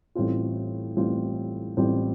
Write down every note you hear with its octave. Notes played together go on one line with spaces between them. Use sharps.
A1 A2 G3 C4 F4
A1 A2 G3 C4 F4
A1 A2 G3 C4 F4